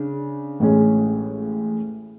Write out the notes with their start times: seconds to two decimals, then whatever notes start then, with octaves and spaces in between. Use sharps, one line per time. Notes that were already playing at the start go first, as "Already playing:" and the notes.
Already playing: C#3 D4
0.60 A1 A2 G#3 C#4 G#4